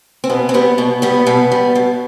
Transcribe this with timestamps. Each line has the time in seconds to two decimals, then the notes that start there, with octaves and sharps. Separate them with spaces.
0.24 C4
0.29 B2 B3
0.49 C4
0.54 G3 B3
0.78 B2
1.02 G3 B3
1.27 B2
1.52 G3
1.75 B2